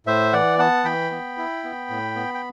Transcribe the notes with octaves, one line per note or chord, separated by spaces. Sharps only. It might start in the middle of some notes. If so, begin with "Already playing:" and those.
A2 C5 E5
E3 D5 F#5
B3 F#5 A5
E3 G5 B5
B3
E4
B3
A2
B3
G5